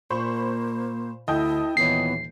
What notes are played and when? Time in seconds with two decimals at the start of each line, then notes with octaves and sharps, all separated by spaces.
0.10 A#2 A#3 C5 B5 C#6
1.28 D2 E4 D#5 G5 A5 G6
1.77 D#1 E3 B3 C#5 C7